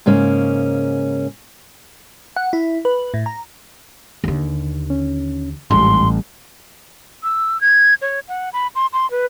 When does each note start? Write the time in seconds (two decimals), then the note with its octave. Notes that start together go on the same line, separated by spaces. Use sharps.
0.06 G#2 C#3 A#3 C#4
2.36 F#5
2.53 E4
2.85 B4
3.14 A2
3.26 A#5
4.24 D#2 D3
4.90 C#4
5.71 A1 D#2 G#2 G3 C6
7.23 E6
7.61 G#6
8.02 C#5
8.28 F#5
8.53 B5
8.75 C6
8.93 C6
9.11 B4